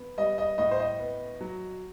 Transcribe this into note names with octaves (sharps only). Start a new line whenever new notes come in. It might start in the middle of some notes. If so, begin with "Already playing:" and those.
Already playing: B3
G3 D#5
D#5
A2 D#5
C5
D#5
B3
F#3